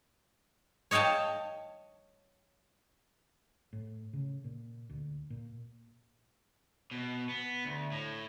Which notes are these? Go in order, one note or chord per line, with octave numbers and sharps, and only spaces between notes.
C#5 D#5 F5 G5 A5
A2
C#3
A#2
D2
A#2
B2
B3
D2
A2